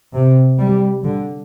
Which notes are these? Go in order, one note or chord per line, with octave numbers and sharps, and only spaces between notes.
C3
G3
D3